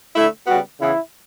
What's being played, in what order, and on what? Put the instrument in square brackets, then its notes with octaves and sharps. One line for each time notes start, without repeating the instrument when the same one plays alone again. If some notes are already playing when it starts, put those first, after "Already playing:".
[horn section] D3 A3 E4
C#3 G3 B3 F#4
C#3 E3 B3 E4